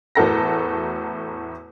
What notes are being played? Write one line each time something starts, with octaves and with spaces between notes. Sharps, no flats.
E2 A2 F#4 A4 A#4 A#6